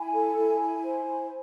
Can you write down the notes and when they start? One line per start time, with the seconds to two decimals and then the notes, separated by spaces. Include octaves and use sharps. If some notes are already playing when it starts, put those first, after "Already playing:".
Already playing: E4 G#5
0.13 A4
0.36 E4
0.60 E4
0.82 C5
1.05 E4